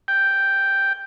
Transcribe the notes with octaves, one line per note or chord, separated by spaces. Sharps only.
G5